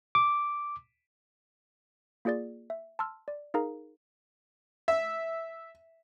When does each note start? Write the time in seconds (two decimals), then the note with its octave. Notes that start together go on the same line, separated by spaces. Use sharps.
0.15 D6
2.25 A#3 F4 G#4 D5 A6
2.70 E5
2.99 A5 C6 E6 F6
3.28 D5
3.54 D#4 G#4 A#4 F5 A#5
4.88 E5